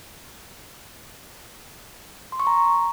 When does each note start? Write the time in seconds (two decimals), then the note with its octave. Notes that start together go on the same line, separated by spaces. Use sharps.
2.32 C6
2.40 C#6
2.47 A#5